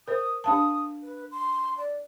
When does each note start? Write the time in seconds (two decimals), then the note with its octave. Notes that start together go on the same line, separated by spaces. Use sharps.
0.08 A#4 C5 D#6
0.44 D4 F5 A5 D#6
1.03 B4
1.31 C6
1.77 D5